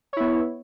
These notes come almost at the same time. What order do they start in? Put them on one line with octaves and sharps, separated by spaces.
C#5 E4 B3